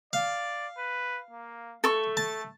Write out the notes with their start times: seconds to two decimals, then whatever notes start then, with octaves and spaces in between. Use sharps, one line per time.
0.13 D5 F5
0.78 B4
1.31 A#3
1.84 A3 A4 C#6
2.17 A5